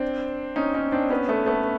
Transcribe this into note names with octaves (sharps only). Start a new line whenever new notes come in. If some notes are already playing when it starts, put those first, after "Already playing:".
Already playing: C4 D4
C#4 D#4
C#4 D#4
C4 D4
B3 C#4
A3 B3
A3 B3